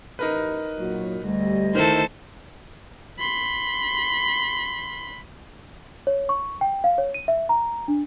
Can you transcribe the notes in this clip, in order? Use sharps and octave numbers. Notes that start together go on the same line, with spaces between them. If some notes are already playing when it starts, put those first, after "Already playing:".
A1 D#4 A#4 B4
A#2 F#3 F#4
D2 G3 D#5
D#3 E4 A4 C5
B5 C6
C#5
C#6
G5
F5
C#5
D#7
E5
A#5
D4